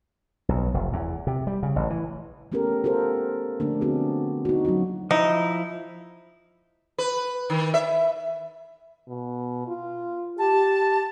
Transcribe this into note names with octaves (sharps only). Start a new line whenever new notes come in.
B1
F1
E2
C3
G3
C#3
A1
E3
A3 B3 C#4 G4 A4 A#4
F4 G4 A4 A#4 C5
D3 F3 A3 A#3 D4
B3 C4 D4 F#4 G#4
D#4 F#4
F#3 C#4 F4 F#4
F3 D#4 E4
B4
D#3
E5
B2
F4
G4 A5